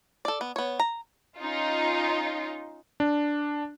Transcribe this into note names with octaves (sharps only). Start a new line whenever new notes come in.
A4 D5
B3
B3 C#5
A#5
C#4 D#4 F4
D4